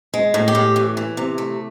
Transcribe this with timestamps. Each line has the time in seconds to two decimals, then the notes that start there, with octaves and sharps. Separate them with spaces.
0.14 G#3
0.34 A2
0.48 G4
0.55 A2
0.76 E3
0.97 E3
1.17 C3
1.38 A3